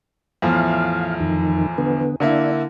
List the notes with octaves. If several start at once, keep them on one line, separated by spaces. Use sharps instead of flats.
E2 A2 F3 F5
F2 D#3
D3 B3
D3 A#3 D4 E4